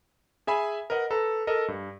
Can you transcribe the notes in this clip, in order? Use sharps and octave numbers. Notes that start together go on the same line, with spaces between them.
G#4 E5 G#5 B5
A#4 B4 D#5 F#5
A4 B4 A#5
A4 A#4 D#5
G2